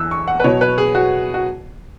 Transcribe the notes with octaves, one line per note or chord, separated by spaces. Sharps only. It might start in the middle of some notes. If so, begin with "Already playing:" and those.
Already playing: E2 E3 E6 F#6
C#6
F#5
B4
B2 F#3 C#5
B4
G#4
F#4
F#4